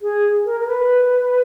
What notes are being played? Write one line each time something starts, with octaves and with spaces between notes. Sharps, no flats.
G#4
A#4
A#4
B4